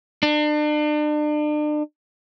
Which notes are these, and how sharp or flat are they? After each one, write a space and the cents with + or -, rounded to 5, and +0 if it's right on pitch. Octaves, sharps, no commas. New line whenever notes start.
D4 +40